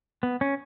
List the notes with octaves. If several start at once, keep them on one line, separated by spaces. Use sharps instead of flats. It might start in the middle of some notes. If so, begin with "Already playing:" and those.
B3
C#4